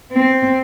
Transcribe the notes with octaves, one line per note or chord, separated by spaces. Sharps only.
C4